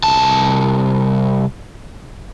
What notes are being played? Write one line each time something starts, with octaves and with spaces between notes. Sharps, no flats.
C2 A5